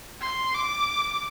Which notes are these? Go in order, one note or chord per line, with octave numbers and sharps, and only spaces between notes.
C6
D6